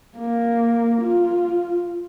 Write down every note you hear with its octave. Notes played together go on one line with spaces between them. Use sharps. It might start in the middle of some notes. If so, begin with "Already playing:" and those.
A#3
F4